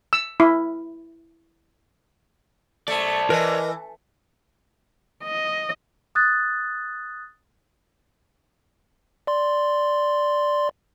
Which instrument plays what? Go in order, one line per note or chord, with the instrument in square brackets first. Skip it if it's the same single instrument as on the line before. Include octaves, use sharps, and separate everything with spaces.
[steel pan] E6
E4
[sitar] A3 [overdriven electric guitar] C5 D5
[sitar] E3 [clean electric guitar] A#4 B4 D#5
[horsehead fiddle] D#5
[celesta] D#6 F#6 A6
[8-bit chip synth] D5 C6